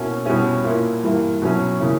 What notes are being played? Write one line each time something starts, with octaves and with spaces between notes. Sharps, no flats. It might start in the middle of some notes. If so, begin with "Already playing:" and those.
Already playing: B2 A#3 C#4 E4
B2 G3 C#4 E4
A#2 A#3 E4
G2 E3 A#3 E4
B2 F#3 C#4 E4
C#3 E3 A#3